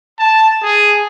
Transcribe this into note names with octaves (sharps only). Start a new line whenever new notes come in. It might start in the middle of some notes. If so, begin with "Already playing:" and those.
A5
G#4